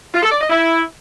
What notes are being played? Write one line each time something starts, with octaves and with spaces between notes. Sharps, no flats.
F4
A4
D5
D#5
E4